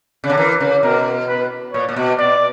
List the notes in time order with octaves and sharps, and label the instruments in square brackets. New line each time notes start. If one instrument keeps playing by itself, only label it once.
[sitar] C#3
D3
[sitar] E3 [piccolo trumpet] A#4
[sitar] C#3
[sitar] B2 [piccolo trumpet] A#4
[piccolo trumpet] B4
[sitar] A#2 [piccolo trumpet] C#5
[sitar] A#2
B2
[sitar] B2 [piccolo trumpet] D5